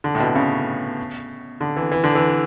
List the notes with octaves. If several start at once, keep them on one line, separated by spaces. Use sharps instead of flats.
D3
A2
B2
C#3
D3
E3
E3
D3
E3